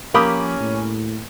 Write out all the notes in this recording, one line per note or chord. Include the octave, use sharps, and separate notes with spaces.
F3 A#3 C#4 G4 A#4 B5 D#6
A2